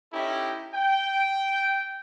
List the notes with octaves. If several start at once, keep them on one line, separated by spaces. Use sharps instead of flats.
C#4 D#4 E4 G4 A4
G5